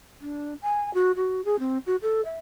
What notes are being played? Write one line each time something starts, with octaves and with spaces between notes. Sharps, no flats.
D4
G#5
F#4
F#4
G#4
C4
F#4
A4
E5